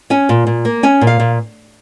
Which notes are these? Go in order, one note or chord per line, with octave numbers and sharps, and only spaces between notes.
C#4 G#5
A#2
A#2
A#3
C#4 G#5
A#2
F5
A#2